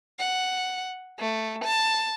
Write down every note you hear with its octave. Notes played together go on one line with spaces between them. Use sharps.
F#5
A3
A5